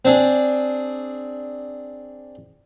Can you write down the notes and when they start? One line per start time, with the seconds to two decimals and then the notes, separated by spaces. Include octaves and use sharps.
0.05 C4 D4 G#4